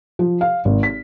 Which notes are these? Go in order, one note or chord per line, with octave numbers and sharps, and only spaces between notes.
F3
F5
G#1
B6